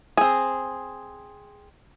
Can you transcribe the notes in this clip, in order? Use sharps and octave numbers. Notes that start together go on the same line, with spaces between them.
C4 G#4